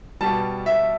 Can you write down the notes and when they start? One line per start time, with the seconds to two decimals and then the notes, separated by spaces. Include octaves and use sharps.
0.21 B2 G3 A5
0.66 E5